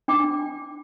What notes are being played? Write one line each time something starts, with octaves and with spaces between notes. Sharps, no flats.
D4 G5 D6